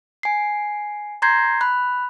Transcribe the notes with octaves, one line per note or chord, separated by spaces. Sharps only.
G#5 C7
A#5 C6 G6 G#6 A#6 C7
B5 F#6